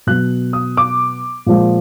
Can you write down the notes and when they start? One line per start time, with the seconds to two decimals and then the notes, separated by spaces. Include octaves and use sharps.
0.07 B2 F#3 B3 F#6
0.53 D#6
0.77 D6
1.46 A#2 F3 G#3